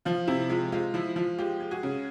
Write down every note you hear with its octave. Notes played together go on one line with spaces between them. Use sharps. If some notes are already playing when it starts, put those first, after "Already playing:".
F3 F4
C3 E4
G#3 F4
G#3 F4
F3 E4
F3 F4
G#3 F4 G4
G#3
F#4 G#4
C#3